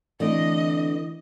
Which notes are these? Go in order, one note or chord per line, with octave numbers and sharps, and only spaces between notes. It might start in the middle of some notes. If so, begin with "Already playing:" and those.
D3 E3 A3 C4 D4 D#5